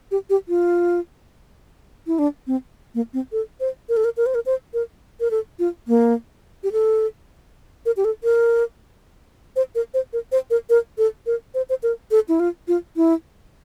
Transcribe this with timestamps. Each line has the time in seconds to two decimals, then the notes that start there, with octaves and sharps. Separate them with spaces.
0.11 G4
0.30 G4
0.49 F4
2.07 E4
2.19 D4
2.47 C4
2.95 A#3
3.14 C4
3.32 A4
3.60 C5
3.89 A#4
3.97 A4
4.04 A#4
4.17 A#4
4.26 C5
4.35 A#4
4.46 C5
4.74 A#4
5.20 A#4
5.31 A4
5.59 F4
5.88 A#3
6.63 G4
6.72 A4
7.86 A#4
7.97 G4
8.05 A4
8.24 A#4
9.56 C5
9.75 A#4
9.94 C5
10.13 A#4
10.32 C5
10.50 A#4
10.70 A#4
10.98 A4
11.26 A#4
11.54 C5
11.69 C5
11.83 A#4
12.11 A4
12.29 E4
12.40 F4
12.68 F4
12.96 E4